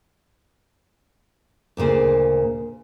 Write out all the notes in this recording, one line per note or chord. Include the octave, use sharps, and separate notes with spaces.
D2 A#2 C#3 C5